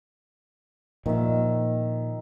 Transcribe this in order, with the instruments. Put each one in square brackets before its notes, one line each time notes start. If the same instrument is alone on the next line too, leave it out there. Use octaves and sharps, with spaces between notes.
[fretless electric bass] A#2 F3 [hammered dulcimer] D#3 E5